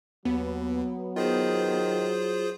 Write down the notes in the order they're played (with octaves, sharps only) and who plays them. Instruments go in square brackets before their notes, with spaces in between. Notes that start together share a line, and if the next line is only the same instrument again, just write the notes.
[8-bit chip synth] D#2 [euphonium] F#3 [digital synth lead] B3
[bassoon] D#3 [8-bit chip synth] F4 G#4 C5